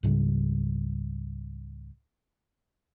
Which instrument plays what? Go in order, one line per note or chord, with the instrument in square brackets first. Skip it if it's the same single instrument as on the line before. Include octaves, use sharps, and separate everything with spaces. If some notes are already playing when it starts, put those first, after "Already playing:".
[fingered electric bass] C#2 G#2 C#3 G3